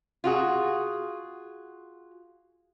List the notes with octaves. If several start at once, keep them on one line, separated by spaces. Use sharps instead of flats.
F4 F#4 G#4